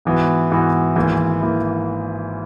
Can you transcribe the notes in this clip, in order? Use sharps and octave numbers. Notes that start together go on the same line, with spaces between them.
G#2 E3 B3 F#4
G#2 E3 B3 F#4
G#1 G#2 E3 A#3 E4
E3 A#3 E4